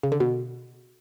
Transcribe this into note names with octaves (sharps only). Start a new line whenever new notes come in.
C#3
D3
B2